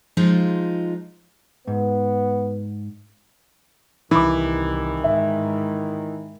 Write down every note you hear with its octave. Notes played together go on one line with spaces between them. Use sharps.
F3 G#3 D#4 F4
G#2 B3
C2 D#3 E3 B5 D6
G#2 E5